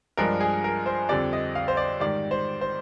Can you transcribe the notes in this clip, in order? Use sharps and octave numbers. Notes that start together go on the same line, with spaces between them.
G2 F3 G#3 D4 A#4
G#4
A#4
C5
F2 D3 G3 C4 D5
D#5
F5
C5
D5
G#2 D#3 G3 D5
C5
C5